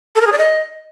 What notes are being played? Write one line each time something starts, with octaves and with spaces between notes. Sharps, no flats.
A4
A#4
G#4
D5
D#5